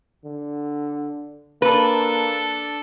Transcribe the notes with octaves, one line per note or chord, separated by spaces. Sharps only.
D3
A#3 D4 A4 B4